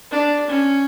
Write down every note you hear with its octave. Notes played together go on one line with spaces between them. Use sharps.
D4
C#4